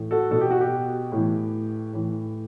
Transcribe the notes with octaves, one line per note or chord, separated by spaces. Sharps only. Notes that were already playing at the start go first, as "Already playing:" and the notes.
Already playing: A2 E3
F#4 A4
B2 A4
G4
F#4
G4
A2 E3
A2 E3